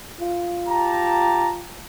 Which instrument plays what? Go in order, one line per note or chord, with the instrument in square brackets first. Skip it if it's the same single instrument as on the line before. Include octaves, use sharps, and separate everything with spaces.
[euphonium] F4
[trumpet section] G4 A5 A#5